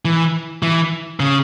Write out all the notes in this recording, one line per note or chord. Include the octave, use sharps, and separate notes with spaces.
E3
E3
C#3